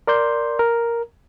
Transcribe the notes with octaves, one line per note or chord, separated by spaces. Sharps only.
A#4 D5 C6 G6
A#4